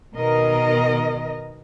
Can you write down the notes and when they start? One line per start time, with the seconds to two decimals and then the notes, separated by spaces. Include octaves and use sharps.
0.16 B2 D#3 A#4 D#5